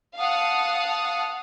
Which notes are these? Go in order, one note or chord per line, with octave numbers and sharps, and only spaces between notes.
F5 F#5 A5 D#6